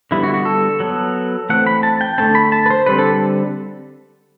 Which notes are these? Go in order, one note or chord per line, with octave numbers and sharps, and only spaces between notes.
D3 G3 B3 E4
F#4
F#4
A4
F#3 B3
E3 A3 C4 F#5
B5
A5
G5
D3 A3 C4 A5
B5
A5
B4
C5
D3 G3 C4 B4
A4